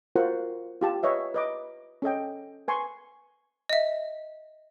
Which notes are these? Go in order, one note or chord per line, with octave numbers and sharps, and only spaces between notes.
F4 F#4 A#4 C5 F#5
F4 G4 A5
B4 C#5 D#5 E5
B4 D#5 D6
C#4 A4 D#5 G5
B4 G#5 C6 C#6
D#5 E5